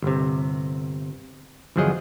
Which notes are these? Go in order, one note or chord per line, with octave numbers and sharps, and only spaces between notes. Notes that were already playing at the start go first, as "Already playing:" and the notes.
G1 C3
G1 E2 F3 F#3 G#4 D#5